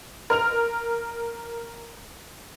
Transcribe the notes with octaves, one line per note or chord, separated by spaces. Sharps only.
A#4 F6 F7